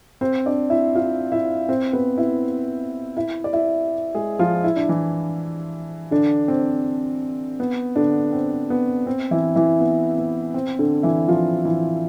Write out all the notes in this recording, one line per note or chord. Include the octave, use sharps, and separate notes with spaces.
C4 C5
D4 D5
E4 E5
F4 F5
E4 E5
C4 C5
B3 B4
E4 E5
E4 E5
D5
E4 E5
G#3 G#4
F3 F4
E4
D4
E3 E4
D3 D4
C4
B3
D3 D4
C4
B3
C4
E3 E4
E3 E4
B3
B3
C4
D3 D4
E3 E4
F3 F4
E3 E4